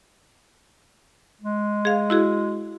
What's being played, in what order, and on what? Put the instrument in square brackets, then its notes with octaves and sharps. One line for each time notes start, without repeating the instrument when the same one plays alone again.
[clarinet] G#3
[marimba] G#4 F5
E4 F#4 G#4